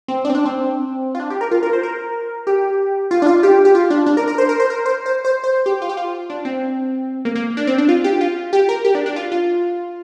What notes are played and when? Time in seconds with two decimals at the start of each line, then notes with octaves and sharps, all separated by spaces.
0.08 C4
0.25 D4
0.30 C4
0.35 D4
0.45 C4
1.15 F4
1.20 D4
1.30 G4
1.41 A#4
1.51 F4
1.63 A#4
1.73 C5
1.83 A#4
2.47 G4
3.11 F4
3.22 D4
3.27 F4
3.43 G4
3.65 G4
3.75 F4
3.90 D4
4.06 D4
4.17 A#4
4.28 A#4
4.38 C5
4.49 A#4
4.60 C5
4.70 A#4
4.86 C5
5.06 C5
5.25 C5
5.44 C5
5.66 G4
5.82 F4
5.89 G4
5.97 F4
6.30 D4
6.45 C4
7.25 A#3
7.36 A#3
7.57 D4
7.67 C4
7.78 D4
7.89 F4
8.04 G4
8.21 F4
8.53 G4
8.69 A#4
8.85 G4
8.95 D4
9.06 D4
9.16 F4
9.32 F4